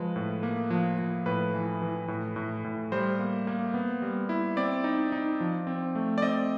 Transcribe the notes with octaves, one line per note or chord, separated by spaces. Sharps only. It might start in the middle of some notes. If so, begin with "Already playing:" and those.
Already playing: F3 G#3 B4
A2
A#3
F3
F3
A2 B4
E3
E3
A2
A2
A2
G3 C5
A#3
A#3
B3
G3
E4
C4 D5
D#4
D#4
F3
C4
A3
D5
C4 D#5